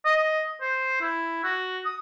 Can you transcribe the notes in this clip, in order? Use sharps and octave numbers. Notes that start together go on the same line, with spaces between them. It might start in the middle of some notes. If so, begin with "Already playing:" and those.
D#5
C5
E4
F#4
D#6